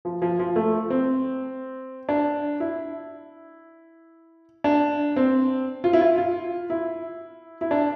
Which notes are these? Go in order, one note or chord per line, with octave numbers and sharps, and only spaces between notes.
F3
F3
F3
A3
C4
D4
E4
D4
C4
F4
E4
F4
F4
E4
E4
D4